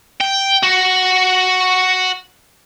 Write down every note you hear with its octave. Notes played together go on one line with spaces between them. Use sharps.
G5
F#4